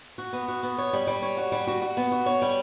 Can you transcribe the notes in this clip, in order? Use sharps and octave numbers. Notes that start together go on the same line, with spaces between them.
F#4
B3
F#4
B3
C#5
G3
G3
C#5
F#4
G3
F#4
F#4
B3
F#4
C#5
G3